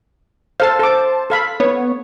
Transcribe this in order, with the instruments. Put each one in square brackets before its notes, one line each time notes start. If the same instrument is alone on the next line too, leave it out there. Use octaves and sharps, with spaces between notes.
[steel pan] A4 F5 [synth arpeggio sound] C5 A5
[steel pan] A4 D6
A4 F5 B5
[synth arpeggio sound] B3 C#5